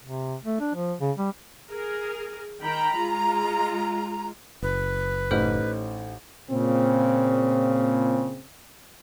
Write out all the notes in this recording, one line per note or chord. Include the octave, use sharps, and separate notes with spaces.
C3
A3
D4
F3
C#3
G3
G#4 A#4
D#3 G5 A#5 B5
G#3 F4
F#1 B4
A1 D#4 A4 C5 G6
A#2 C#3 C4